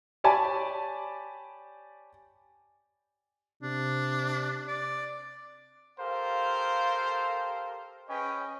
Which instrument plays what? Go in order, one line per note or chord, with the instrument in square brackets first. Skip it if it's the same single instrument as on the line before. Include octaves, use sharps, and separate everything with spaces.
[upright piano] G4 C#5 D5 G#5 A5 B5
[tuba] C3 [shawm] D4
[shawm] D5
[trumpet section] G4 A4 A#4 C5 F5
C#4 G#4 B4 C#5 D#5 G5